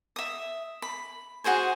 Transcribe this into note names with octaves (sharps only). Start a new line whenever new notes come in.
E5 D#6
B5
F#4 G#4 C5 G#5